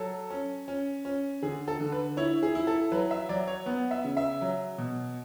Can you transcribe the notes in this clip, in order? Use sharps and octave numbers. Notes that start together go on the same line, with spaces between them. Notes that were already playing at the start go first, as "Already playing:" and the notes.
Already playing: F#3 A4
C#4
C#4
C#4
D3 G#4
A4
D3
B4
E4 C#5
G#4
E4
A4
F#3 B4
E5
F#3 D5
C#5
B3
E5
C#3
E5
F#3
B2